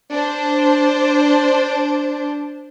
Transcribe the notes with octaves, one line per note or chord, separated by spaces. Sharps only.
D4 C5